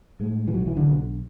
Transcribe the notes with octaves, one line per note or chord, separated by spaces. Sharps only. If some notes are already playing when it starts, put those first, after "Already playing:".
A2 G#3
E3
B1 F#3
E3
D3
B1